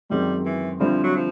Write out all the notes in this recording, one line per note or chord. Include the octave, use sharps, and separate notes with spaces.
F#2 D#3 G3 G#3 C4
E3
G2 D3 F3 G3 C4 E4
F#3
F3